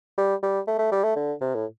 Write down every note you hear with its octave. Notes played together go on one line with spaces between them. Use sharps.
G3
G3
A3
A3
G3
A3
D3
C3
A2